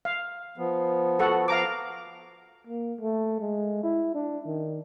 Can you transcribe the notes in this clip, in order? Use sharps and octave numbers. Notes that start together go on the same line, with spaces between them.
F5
F3 B3
F#4 A4 F#5
F5 A#5 D6
A#3
A3
G#3
E4
D4
D#3